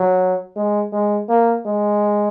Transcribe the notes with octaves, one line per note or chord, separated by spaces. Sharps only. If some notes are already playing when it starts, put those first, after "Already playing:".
Already playing: F#3
G#3
G#3
A#3
G#3